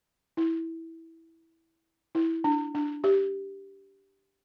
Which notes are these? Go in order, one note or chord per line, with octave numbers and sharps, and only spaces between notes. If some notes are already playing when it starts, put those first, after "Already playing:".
E4
E4
D4
D4
G4